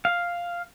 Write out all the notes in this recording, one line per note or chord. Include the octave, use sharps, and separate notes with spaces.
F5